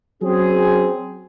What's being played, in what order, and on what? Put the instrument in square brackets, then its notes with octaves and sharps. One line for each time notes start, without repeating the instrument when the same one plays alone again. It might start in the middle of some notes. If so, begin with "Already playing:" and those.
[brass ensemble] F#3 C4 C#4 G#4